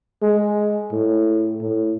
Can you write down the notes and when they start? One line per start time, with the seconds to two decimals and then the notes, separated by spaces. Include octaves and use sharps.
0.22 G#3
0.92 A2
1.61 A2